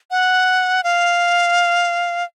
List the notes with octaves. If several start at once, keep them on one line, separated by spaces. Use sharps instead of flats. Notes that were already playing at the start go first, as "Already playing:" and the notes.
F#5
F5